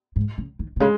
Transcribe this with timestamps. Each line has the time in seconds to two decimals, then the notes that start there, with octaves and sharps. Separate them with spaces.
0.16 G#2
0.38 C#3
0.59 D#3
0.76 B2
0.80 C#3 G#3